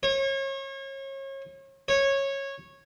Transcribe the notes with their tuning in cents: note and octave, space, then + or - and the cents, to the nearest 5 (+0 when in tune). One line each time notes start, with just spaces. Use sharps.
C#5 -35
C#5 -15